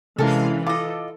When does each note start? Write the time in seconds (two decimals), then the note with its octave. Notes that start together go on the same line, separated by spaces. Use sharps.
0.18 C3 E3 G#3 C#4 A4 A#4 F5
0.67 F4 A4 D#5 D6